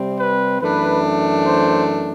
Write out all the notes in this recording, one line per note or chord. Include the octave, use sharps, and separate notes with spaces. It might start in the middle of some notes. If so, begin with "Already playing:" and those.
Already playing: C3 G3 C4
B4
F#2 E3 A3 D4 B4
C5